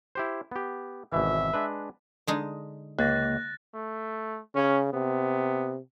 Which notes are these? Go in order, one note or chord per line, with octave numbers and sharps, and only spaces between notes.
E4 G4 C5
B3 G4
G#1 B2 E3 E5
G#3 D4 B4
D3 G#3 D#4
C#2 A#3 F#6 A6 A#6
A3
C#3 C#4
C3 B3